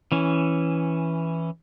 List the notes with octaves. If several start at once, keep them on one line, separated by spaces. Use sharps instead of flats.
E3 C#4